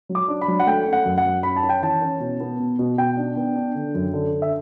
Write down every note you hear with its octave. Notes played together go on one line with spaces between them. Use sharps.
F#3
D6
D4
B5
F#3
F#5
A3 G5
C#4
F#5
F#2
F#5
F#2
C#4 B5
A5
C#4
G5
E3 A5
C#4
B2
B3
B2
B2
B2 G5
D4
B3
D4
D3
F#2
D3
D3
E5